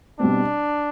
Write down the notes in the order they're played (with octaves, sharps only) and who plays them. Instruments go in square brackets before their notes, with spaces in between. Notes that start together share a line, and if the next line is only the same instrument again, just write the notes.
[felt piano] B2 G3 C4 [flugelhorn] D4